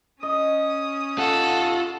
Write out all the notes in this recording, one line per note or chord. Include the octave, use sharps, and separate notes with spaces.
C#4 D#5 D#6
F4 A4 F#5